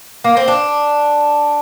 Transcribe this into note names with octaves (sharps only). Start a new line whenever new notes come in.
A#3
C4
D4